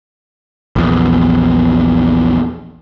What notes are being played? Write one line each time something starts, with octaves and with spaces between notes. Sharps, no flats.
A#1 E2